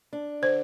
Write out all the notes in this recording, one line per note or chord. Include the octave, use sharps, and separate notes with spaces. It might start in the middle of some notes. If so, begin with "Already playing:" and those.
D4
D3 C5